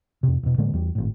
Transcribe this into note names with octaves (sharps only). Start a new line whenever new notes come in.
F2 C3
E1 B2
A2 D3 G#3 A#3
E2 G3
G#1 A2